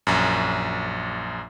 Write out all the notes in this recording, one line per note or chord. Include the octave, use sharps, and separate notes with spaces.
A#1 F#2